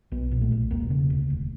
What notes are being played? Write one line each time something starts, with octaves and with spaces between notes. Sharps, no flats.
B1 B3
A#2
A3
B1
E1 A#3
C#3
D2
E1